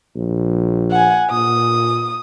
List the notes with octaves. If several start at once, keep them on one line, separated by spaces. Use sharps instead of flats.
A#1
F#5 G#5
A#2 D#6